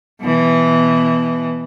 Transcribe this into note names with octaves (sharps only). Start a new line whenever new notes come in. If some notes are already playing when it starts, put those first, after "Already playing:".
B2 E3